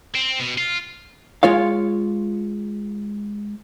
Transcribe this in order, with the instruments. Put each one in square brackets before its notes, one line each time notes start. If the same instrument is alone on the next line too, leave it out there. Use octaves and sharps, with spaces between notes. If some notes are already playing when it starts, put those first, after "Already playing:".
[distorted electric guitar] C4
B2
F4
[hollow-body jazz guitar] G#3 F4 C#5 F5